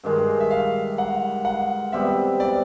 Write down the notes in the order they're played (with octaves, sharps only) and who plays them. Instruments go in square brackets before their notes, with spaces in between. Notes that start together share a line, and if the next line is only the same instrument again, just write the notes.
[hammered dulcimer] G2 D#3 G#3
[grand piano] E5
F5
F#5
F#5
[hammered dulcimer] B2 G3 C4 [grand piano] E5
[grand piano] D5